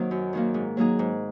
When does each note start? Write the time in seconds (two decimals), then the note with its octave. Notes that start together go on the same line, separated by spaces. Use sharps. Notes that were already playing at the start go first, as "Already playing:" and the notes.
Already playing: D#3 F#3 A#3 C4
0.11 F#2
0.33 D#3 F#3 A#3
0.54 G#2
0.77 F#3 A#3 D#4 G#4
0.99 G#2